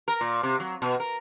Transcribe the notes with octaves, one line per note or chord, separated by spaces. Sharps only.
A#4
A#2
C3
F#3
B2
A#4